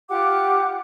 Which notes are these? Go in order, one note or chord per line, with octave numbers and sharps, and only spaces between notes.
F4 G4 F#5 D6